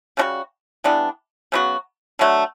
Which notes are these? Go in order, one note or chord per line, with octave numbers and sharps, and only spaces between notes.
C#3 G3 D4 F#4
E3 G3 B3 D4
C#3 F#3 B3 F#4
D3 F#3 A3